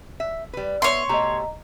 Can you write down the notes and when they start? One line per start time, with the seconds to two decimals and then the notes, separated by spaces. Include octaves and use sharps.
0.20 E5
0.53 G3 B4
0.82 B3 C#5 E5 C6
1.09 B2 A3 G4 D#5 A#5